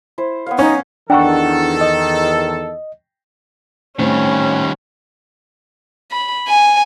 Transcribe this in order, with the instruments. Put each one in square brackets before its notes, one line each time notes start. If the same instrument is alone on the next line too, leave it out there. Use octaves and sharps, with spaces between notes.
[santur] E4 C5
B3 C#5 F5
[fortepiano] C#4 [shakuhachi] D#4
[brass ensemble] E2 D#3 A4 [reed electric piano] D4 F#5 [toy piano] G5 A#5 C#6
[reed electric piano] D#5
[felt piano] A2 C4 [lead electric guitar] D#3 G3 [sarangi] C#4
[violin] B5
G#5